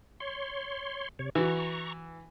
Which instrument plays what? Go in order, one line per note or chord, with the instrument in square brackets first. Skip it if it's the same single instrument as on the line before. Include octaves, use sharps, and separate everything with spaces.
[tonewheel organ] C#5 C6
C3 C#5
[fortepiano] E3 F#4 [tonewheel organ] A#5 C#6